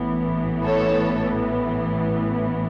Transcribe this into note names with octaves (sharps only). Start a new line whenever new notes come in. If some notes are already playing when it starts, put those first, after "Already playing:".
Already playing: A1 A2 E3 B3
A4 C#5